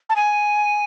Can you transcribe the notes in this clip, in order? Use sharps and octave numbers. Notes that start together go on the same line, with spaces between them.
A5
G#5